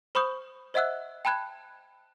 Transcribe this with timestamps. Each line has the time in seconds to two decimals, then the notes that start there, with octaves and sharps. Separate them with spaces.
0.15 C5 B5 C#6 D#6 G6
0.74 C5 D#5 E5 F#5 E6 F#6
1.25 G5 A5 B5 F#6 G#6